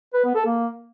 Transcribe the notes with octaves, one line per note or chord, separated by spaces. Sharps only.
B4
B3
A4
A#3